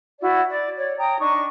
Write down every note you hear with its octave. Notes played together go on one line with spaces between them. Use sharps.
E4 F#4 D5
D5
C#5 D5
G5 A#5 D#6
D4 D#4 C#6